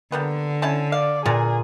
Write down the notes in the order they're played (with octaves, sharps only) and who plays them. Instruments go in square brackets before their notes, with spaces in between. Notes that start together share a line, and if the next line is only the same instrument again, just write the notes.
[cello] D3 [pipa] G3 A#3 B3
[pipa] C#4 E4 A5
[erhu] D5 [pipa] F5
[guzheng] A#2 [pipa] E3 F4 A#5 [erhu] G#4